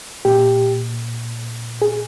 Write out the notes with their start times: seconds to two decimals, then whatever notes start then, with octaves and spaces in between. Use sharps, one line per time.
0.25 A#2 G4
1.82 G#4